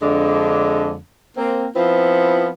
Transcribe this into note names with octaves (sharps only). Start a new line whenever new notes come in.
F2 D3 G#3 D4
A#3 C4
F3 B3 C4 E4 F4